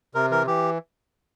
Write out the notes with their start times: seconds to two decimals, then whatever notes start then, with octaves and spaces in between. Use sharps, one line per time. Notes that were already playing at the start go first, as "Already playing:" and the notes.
0.15 C3 A#4
0.31 E3 A#4
0.47 E3 G4